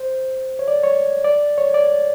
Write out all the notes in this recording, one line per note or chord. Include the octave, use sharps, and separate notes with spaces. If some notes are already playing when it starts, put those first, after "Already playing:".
Already playing: C5
C#5
D5
C#5
D5
C#5
D5